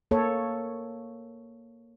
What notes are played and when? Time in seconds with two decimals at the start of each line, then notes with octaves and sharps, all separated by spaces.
0.11 A#3 A4 C#5